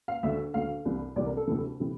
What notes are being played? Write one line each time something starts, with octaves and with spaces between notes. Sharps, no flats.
F5
D2 D3 E5
D2 D3 F5
C2 C3 E3
C2 C3 E3 D5
A#4
A4
D2 C3 E3
C3 E3